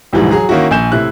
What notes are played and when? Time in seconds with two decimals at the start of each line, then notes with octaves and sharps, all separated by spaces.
0.13 D2 G#2 B2 E3 F3 G3
0.31 F#3 G#4 A#5
0.49 D#3 A#3 C#4 E4 F#4
0.71 A#1 G#5 G6 E7
0.92 A2 C3 E4 F#6